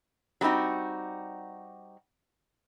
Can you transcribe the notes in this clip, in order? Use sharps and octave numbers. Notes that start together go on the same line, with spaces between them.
F#3 G3 C4 D#4 F#4